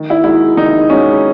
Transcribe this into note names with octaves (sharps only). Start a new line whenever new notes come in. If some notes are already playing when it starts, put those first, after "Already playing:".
Already playing: D#3
E4
G#3 D#4 E4 F#4
D#3 D#4
G#3 C#4 D#4 F#4